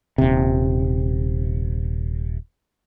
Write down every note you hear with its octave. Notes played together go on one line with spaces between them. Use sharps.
D#1 C3